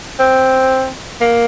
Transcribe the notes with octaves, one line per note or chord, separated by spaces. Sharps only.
C4
A#3